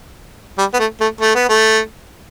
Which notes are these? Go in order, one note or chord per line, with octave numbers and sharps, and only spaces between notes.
G3
B3
A3
A3
A3
B3
A3